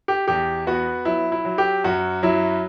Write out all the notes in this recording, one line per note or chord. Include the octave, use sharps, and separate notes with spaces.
G4
E2 G4
B3 F#4
F#3 E4
E4
F#3
G4
F#2 F#4
F#3 E4